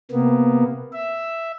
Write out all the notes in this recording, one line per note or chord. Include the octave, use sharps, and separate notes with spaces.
C3 A#3 B3
E5